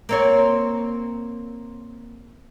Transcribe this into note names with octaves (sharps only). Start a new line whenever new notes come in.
A#3 C4 C#5